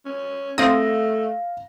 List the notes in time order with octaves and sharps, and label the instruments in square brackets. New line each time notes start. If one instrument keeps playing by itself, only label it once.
[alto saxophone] C#4
[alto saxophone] A3 [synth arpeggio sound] C4 D#6 [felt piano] F5 A#6